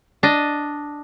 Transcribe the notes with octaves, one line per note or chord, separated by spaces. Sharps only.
D4 D#5